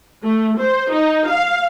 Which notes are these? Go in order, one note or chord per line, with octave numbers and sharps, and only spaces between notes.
A3
C5
D#4
F5